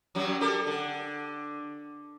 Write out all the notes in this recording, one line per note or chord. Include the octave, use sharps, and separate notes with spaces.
F#2 F#3 G3
G4 A4 A#4
D3